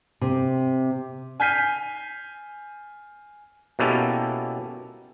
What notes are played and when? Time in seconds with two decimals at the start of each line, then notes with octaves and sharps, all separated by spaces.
0.21 C3
1.40 G#5 F6 G6 B6 C7 D#7
3.79 B2 A#3 C#4 E4 G4 A4